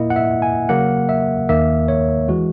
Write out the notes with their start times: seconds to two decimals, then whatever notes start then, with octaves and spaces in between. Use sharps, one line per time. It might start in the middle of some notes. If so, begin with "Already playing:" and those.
Already playing: A#2 A#3 E4 D#5
0.10 F#5
0.16 E5
0.42 G#5
0.69 C#3 F#3 A#3 F#5
1.09 E5
1.49 D#2 D#3 A#3 E5
1.88 C#5
2.28 E3 G#3 F#4